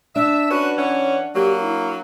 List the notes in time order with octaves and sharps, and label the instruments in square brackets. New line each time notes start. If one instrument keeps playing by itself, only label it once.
[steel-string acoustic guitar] D4 [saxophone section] E5
[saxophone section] C#4 F#4 [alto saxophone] B4
[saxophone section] E3 C#4 [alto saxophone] F#5
[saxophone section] F#3 A#3 [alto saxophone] G4
[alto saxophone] E4